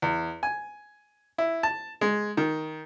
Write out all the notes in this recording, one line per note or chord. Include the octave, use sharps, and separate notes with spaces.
E2
G#5
E4
A5
G#3
D#3